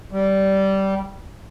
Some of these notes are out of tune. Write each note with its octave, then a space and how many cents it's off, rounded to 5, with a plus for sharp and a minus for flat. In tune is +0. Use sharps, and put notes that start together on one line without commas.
G3 -15